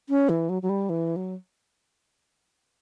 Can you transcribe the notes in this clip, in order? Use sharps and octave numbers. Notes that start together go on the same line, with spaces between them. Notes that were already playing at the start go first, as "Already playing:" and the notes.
C#4
E3
F#3
F#3
G3
E3
F#3